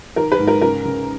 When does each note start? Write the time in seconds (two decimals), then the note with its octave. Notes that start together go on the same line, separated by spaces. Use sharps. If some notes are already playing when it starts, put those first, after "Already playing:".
0.16 D#3 A#4
0.32 B4
0.39 G#2
0.47 A#4
0.61 C#3 A#4
0.85 C#3